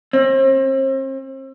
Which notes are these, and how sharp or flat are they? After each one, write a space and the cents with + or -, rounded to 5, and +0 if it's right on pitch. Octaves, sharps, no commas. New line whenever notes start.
C4 +40